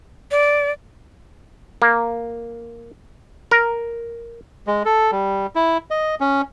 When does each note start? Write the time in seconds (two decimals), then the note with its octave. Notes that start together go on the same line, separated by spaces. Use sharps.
0.31 D5
1.82 A#3
3.51 A#4
4.67 G#3
4.85 A4
5.12 G3
5.56 E4
5.91 D#5
6.20 C#4